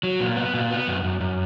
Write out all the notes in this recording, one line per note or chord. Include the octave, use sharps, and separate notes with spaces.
F#3
A#2
B3
A#2
B3
F#2
F#2
F#2